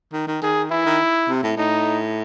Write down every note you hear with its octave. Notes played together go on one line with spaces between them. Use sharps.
D#3
D#3
D#3 G#4
E3 E4
D#3
C3
A2
A2 D#4